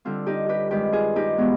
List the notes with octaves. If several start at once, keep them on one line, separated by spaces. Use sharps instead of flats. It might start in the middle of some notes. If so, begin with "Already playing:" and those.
D3 G3 C4 F4
D#4 G4
G4 B4
G2 D#3 G#3 G4 B4
F4 G#4
D#4 G4
B2 G#3 B3